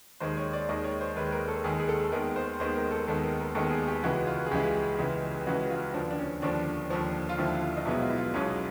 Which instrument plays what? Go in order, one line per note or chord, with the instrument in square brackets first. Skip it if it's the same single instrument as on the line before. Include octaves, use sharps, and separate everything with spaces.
[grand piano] D#2 D#3 G#3 C5
C#5
D5
D#2 D#3 G#3 D#5
C#5
C5
D#2 D#3 G#3 B4
A#4
A4
D#2 D#3 G#3 G#4
G#4
A4
D#2 D#3 G#3 B3 A#4
C5
D#2 D#3 G#3 B3 C5
A#4
A4
D#2 D#3 G#3 B3 A4
A#4
A#4
D#2 D#3 G#3 B3 A4
G#4
G4
C#2 C#3 E3 G#3 F#4
F4
G#4
C#2 C#3 E3 G#3 G4
C#2 C#3 E3 G#3
C#2 C#3 E3 G#3 F#4
F4
D#2 D3 F3 D4
D4
C#4
D#2 D3 F3 D4
D#2 D3 F3
F4
D#2 D3 F3 E4
F4
D#4
B1 B2 G#3 B3 E4
F4
E4
F4
B1 B2 G#3 B3 C#4